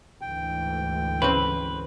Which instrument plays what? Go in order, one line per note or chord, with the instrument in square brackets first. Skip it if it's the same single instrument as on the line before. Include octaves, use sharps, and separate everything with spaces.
[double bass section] D2 G#2 E3 [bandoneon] G5
[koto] C#3 C4 [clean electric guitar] B4